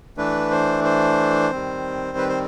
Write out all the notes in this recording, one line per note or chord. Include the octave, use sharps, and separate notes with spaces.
E3 A3 D4 B4
C5
C5
D#3 G3 C4
B4
C5